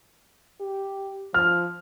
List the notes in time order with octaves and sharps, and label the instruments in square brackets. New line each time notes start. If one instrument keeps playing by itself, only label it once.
[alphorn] G4
[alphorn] F3 [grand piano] F6